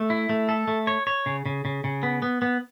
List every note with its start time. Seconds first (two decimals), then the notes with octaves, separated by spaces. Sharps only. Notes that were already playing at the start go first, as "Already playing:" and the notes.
Already playing: A3
0.10 E4
0.29 A3
0.49 A4
0.68 A3
0.87 C#5
1.07 C#5
1.26 C#3
1.46 C#3
1.65 C#3
1.84 C#3
2.03 B3
2.22 B3
2.42 B3